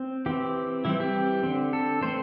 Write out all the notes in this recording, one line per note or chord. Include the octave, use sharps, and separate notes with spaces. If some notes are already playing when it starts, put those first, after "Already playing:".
Already playing: C4
E3 C4 G4
E3 G3 C4 E4
G4
D3 C4
A4
E3 A3 C4 C5